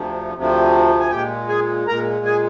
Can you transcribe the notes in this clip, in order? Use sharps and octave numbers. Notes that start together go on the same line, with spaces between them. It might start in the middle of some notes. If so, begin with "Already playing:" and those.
Already playing: D2 C3 F3
D2 C3 F3
G#5
A#2 G#3 G4 G5
G#4 G#5
A#2 G#3 A#4 A#5
G#4 G#5